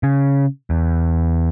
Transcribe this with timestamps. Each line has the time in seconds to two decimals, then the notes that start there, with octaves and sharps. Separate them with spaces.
0.03 C#3
0.70 E2